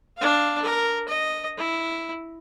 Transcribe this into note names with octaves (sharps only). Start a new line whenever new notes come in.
D4 F5
A#4
D#5
E4